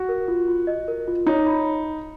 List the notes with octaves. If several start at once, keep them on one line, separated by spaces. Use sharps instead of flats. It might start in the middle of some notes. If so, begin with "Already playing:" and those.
Already playing: F#4
A#4
F4
F4
D#5
A#4
F4
D#4 C#5
B5